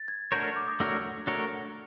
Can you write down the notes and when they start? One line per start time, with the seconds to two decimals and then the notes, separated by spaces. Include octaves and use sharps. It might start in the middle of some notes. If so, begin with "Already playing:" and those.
Already playing: A6
0.08 G#6
0.32 A3 D4 F#4 A#4 C#5 G6
0.43 F6
0.56 D6
0.67 D#6
0.80 A3 D4 F#4 A#4 C#5
1.27 A3 D4 F#4 A#4 C#5